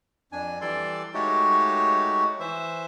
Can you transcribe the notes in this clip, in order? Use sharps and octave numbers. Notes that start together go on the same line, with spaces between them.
F2 D4 G#5
E3 G3 A4 D5 C6
G#3 A3 D#4 F#4 G4 C#5
E3 C5 E5